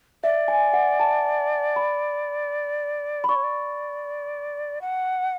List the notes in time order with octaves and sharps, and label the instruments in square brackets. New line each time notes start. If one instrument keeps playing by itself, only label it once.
[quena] D5 [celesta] E5
[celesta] G#5
F#5
A5
B5
B5
[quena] D5 [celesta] C#6
[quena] C#5
D5
F#5